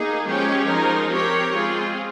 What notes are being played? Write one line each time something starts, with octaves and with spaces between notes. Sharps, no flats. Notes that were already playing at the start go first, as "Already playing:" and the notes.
Already playing: A#3 D#4 G#4
F3 G#3 C#4 G4 C#5
F3 G#3 D#4 A#4
C4 G4 A#4 C#5
G#3 C4 F4 G#4